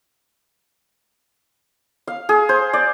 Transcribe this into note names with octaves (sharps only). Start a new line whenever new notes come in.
F5
G#4
C5
D5